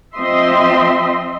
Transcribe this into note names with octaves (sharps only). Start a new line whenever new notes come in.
F3 C4 D#5 E5 C6